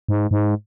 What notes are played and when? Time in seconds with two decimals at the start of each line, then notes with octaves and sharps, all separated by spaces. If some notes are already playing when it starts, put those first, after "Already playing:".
0.09 G#2
0.31 G#2